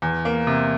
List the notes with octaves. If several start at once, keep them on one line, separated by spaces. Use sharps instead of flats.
E2
A#3
C3